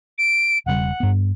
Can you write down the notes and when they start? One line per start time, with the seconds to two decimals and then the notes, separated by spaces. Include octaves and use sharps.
0.18 D7
0.66 E1 C#3 G3 F#5
1.00 G2 B3